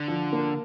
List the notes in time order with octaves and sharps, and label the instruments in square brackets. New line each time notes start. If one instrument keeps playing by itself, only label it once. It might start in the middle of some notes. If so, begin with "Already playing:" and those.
Already playing: [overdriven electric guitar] D3
[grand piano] F3
A#3